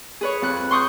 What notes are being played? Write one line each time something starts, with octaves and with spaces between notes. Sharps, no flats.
G#4 B4 C#5
F2 F#6
C6 C#6 D#6 F#6 G6